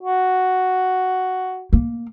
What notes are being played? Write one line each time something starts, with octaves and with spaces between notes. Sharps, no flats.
F#4
A#3